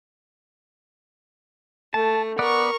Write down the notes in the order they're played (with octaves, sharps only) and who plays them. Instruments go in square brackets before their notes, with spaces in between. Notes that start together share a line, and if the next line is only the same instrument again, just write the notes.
[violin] A3 [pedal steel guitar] A5
[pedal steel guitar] B3 D5 F#5 [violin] A#4 C#6